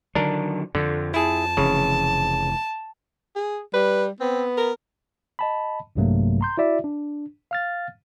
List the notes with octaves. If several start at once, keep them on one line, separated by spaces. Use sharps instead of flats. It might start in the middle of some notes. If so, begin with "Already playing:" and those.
D3 D#3 F#3 D4 A#4
F2 D3
E4 G#4 A5
F1 C#3 E3
G#4
G3 B4
B3 C4
A#4
D#5 A5 B5
A#1 G2 C3 F#3 A3 A#3
A#5 C6 G6
E4 F#4 D5 E5
D4
F5 F6 A6